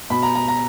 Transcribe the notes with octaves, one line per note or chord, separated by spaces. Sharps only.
B2 B5
A#5
A#5
A#5